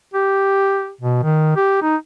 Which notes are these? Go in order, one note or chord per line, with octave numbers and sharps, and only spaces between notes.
G4
B2
D#3
G4
D#4